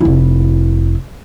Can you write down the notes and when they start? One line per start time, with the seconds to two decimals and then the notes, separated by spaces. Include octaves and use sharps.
0.01 F1 E4